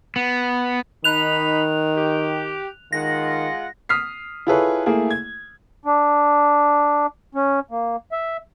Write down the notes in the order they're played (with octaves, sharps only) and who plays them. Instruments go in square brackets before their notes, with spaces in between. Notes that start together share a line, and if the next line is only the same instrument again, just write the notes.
[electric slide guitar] B3
[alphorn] D#3 [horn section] D#4 B5 [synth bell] F#6 F7
[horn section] G4
[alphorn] D#3 [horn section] G#3 F4 F#5 [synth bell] A#6
[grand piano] D#6 F6 B6 C7
E4 F4 G#4 A4 B4 C#5
A3 A#3 E4 G#4
G#6
[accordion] D4
C#4
A#3
E5